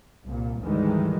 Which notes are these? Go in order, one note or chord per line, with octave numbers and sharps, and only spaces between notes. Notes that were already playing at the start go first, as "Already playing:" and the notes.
C2 A#2
D2 G#2 D#3 E3 G3 G#3